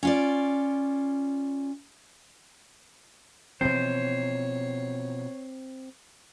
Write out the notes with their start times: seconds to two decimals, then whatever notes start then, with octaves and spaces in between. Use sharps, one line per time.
0.03 C#4 F4 D5
3.61 B2 E3 F3 C4 C5 C#5